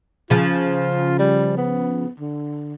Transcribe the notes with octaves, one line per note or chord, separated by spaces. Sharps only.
C#3 F3 F4
G3
B3
D3